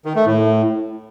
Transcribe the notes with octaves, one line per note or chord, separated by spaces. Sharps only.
D#3
A3
A2